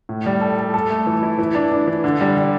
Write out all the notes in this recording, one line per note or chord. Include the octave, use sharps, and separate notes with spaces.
A2
G3
A4
A4
A4
A3
E3
E4
E3
D4
D4
E3
D3
G3
G3